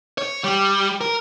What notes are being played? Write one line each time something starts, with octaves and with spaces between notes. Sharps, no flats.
C#5
G3
A#4